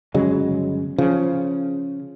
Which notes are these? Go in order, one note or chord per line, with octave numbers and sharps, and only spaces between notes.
G1 C#3 F#3 G#3
C#3 F3